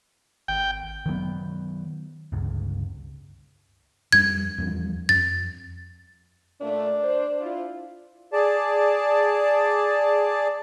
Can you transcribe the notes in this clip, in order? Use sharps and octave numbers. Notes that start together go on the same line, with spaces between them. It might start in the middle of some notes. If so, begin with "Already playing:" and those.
G#1 G5
D#3 F#3 G3 B3
G1 C#2
F2 G3 G#6
E2 F3 G3
F2 A6
A#2 A3 D4
C5
E4 F4
G#4 D5 A5